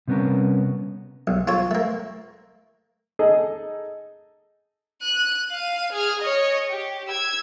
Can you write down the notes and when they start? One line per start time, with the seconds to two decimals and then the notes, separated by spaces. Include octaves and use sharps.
0.08 C3 G3 B3 C#4 A#4
1.27 B1
1.47 F4 A4 C#5
1.71 A3 A#3
3.19 D#4 G#4 A4 D#5
5.02 F#6 D#7
5.51 F5 D#7
5.92 G#4 F6
6.22 C#5 D#5
6.70 G4
7.08 E6 G#6